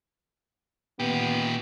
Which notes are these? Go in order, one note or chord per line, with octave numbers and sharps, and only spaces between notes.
A#2 B3 G4